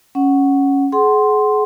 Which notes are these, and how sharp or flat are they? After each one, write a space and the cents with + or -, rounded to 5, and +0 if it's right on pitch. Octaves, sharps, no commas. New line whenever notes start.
C#4 +0 F#5 +0
G#4 +35 F#5 +20 C6 +0